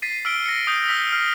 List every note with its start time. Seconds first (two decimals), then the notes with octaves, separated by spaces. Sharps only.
0.02 A6 B6 C7 D#7
0.25 E6 F6 B6 D7 G7
0.46 A#6 C#7
0.67 D#6 G6
0.88 E6 F6 B6 G7
1.13 F6 C7 G7